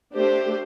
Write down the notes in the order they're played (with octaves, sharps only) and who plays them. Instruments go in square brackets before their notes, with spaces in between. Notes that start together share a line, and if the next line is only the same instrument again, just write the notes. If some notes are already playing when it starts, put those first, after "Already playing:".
[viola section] A3 D4 G4 C5